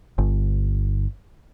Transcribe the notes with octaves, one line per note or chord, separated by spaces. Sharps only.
G1